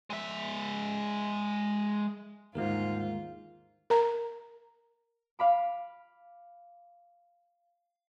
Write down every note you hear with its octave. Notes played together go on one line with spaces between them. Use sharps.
G#3 E5
G1 D#2 G#2 D#3 G#3 F4 G#4 A#4
A#4 A#5
F5 B5 D6